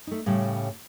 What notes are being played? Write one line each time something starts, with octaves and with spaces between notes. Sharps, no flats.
A3 D#4
A2 C#3 G3